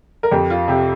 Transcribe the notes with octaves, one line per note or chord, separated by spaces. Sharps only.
A#4
F2 G4
F4
C3 G4